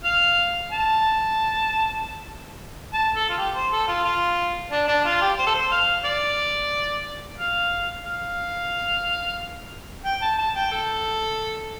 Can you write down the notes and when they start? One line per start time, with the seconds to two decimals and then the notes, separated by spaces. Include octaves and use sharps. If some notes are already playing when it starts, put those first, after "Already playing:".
0.04 F5
0.71 A5
2.94 A5
3.15 A4
3.29 F4
3.37 G4
3.55 C5
3.72 A4
3.88 F4
4.04 F4
4.71 D4
4.88 D4
5.04 F4
5.21 G4
5.38 C5
5.46 A4
5.54 C5
5.71 F5
6.05 D5
7.38 F5
8.05 F5
10.05 G5
10.22 A5
10.38 A5
10.55 G5
10.71 A4